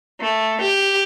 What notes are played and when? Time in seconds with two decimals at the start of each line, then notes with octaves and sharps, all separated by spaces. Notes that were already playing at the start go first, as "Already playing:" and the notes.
0.21 A3
0.62 G4